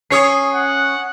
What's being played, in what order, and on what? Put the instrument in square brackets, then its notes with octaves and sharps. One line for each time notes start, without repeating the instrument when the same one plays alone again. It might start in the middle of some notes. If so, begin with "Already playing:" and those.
[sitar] C#4 C#5 [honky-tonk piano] D#6 C7
[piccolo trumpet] F#5